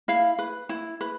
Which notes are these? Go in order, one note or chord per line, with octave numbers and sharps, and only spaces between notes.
E4 F5
B4
E4
B4